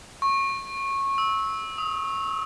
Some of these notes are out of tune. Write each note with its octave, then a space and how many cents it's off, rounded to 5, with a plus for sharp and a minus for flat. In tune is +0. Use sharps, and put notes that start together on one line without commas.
C#6 -20
E6 -20
D#6 +30